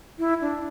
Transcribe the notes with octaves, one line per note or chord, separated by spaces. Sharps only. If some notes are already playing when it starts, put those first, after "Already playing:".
E4
D4